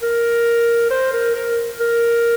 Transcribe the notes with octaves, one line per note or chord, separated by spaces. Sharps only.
A#4
C5
A#4
A#4
A#4